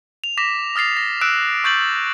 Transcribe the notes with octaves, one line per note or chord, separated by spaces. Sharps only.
F7
D6 A#6 B6 E7
D#6 F6 A6 C7 F7
A#6
E6 F#6 D7 E7
C#6 G6 A6 F#7